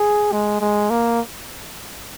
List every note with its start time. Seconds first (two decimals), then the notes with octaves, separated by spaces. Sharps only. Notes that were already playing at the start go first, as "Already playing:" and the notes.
Already playing: G#4
0.32 G#3
0.61 G#3
0.90 A#3